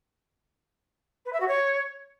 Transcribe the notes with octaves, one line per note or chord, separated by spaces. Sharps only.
B4
E5
F#4
C#5